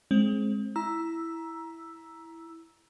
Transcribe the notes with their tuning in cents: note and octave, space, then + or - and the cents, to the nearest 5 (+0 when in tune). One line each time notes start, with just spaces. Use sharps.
G#3 +20 C4 +30
E4 +0 A#5 +15 E6 +0